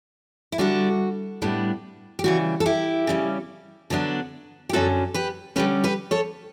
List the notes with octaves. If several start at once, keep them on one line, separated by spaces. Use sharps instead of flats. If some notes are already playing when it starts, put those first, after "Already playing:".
E4
D3 G3 D4 F#4
A2 G3 B3 D4
G4
C#3 E3 G3 F#4
A4
E4 G4
C#3 G3 C#4
D3 F#3 B3 D4
G4
F#2 D3 F#3 C#4 F#4 A4
G4 B4
D3 G3 C#4 G4 B4
G4 B4
A4 C#5